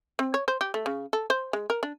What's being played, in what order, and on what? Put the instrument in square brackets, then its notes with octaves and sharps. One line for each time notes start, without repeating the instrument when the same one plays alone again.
[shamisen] C4
C#5
C5
G4
A3
C#3
A4
C5
G#3
A#4
D4